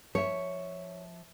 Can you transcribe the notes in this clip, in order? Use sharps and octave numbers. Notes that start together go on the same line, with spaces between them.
F3 C#5 E5